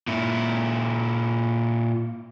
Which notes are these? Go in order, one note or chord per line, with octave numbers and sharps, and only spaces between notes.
A#2 E4